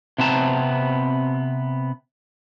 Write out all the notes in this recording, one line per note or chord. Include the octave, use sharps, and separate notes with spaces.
C3 B3 C4 A5 A#5